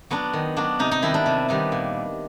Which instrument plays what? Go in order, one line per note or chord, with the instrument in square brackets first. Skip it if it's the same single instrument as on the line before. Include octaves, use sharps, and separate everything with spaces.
[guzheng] F#3 B3 D4
D#3
F#3 B3 D4
C3 D#4
D#4
D#3 G3 B3 D4 E4
D4
C3
D#3 G3 B3 D4
A#2